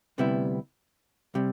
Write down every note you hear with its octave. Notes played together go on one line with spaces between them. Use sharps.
D2 C3 G3 B3 E4
C3 G3